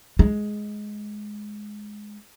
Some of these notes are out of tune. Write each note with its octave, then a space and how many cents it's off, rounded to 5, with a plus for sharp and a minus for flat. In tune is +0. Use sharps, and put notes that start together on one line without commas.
G#3 +10